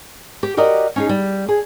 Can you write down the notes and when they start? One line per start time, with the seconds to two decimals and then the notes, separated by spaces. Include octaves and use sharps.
0.43 G4
0.57 F#4 G4 A#4 D5 D#5
0.96 C#4 D#4 G#4
1.09 G3
1.48 G#4